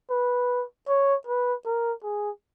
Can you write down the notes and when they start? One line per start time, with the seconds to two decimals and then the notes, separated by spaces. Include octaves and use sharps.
0.10 B4
0.88 C#5
1.27 B4
1.66 A#4
2.03 G#4